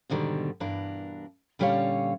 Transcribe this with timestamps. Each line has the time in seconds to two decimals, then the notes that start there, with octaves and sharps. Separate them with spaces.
0.10 G#2 B2 D3 D#3 G3
0.60 G2 B2 E3 D4 A#4
1.59 A#2 D3 G3 C#4 C#5 F5